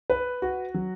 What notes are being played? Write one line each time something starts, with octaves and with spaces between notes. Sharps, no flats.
B4
F#4
F#3